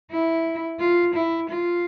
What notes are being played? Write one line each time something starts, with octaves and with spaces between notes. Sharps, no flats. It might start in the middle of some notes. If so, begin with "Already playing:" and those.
E4
F4
E4
F4